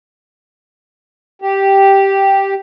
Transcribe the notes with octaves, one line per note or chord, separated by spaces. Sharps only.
G4